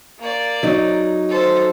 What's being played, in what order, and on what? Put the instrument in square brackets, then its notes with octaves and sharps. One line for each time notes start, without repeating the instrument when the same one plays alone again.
[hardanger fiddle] A#3 D5
[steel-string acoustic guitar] F#3 D#4
[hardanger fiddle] A4 C5